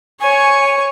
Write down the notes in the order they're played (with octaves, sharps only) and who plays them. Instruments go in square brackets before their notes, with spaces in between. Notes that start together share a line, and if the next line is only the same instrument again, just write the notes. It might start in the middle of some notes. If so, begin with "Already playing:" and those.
[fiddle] C#5 C#6 [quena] G#5